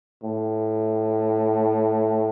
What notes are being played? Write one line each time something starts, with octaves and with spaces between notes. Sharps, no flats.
A2